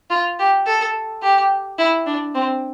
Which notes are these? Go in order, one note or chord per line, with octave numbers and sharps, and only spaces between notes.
F4
G4
A4
G4
E4
D4
C4